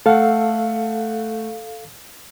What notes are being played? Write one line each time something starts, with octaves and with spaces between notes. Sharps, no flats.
A3 A4 F5 F#5